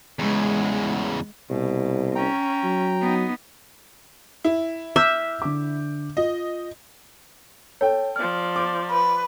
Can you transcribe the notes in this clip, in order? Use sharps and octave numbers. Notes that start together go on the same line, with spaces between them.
E2 C#3 G#3
C2 B2
C#4 G5 A#5
F#3
B3 D#4
E4
E5 D6 F6 G6
D3 D6
F4 D#5
A4 C#5 G5
F3 D5 F6
D6
B4